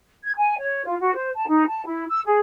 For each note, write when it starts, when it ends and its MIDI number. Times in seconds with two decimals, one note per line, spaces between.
0.23 0.31 92
0.36 0.58 80
0.59 0.83 73
0.84 0.95 65
1.00 1.12 66
1.14 1.30 72
1.35 1.44 81
1.47 1.64 63
1.68 1.84 81
1.86 2.04 64
2.09 2.20 88
2.25 2.40 68